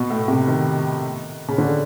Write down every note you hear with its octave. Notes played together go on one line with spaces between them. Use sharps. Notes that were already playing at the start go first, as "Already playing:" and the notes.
Already playing: B2
A2
C3
D#3
C#3
D3